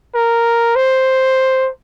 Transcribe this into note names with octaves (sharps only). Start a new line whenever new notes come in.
A#4
C5